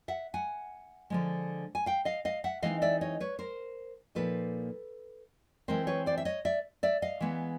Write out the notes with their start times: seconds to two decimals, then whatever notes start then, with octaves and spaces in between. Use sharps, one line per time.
0.08 E5 F#5
0.34 F#5 G#5
1.10 D3 F3 G#3
1.75 G#5
1.86 F5 G5
2.05 D#5 F5
2.25 D#5 F5
2.44 E5 F#5
2.62 E3 G#3 C4 D#4 D#5 F5
2.82 D5 E5
3.01 C#5 D#5
3.20 B4 C#5
3.39 A#4 C5
4.15 A#2 F3 A#3 D#4 A4 B4
5.68 E3 G#3 C4 A#4 C5
5.87 B4 C#5
6.06 C5 D5
6.18 E5
6.25 C#5 D#5
6.45 D5 E5
6.83 D5 E5
7.02 D#5 F5
7.21 E3 G#3 B3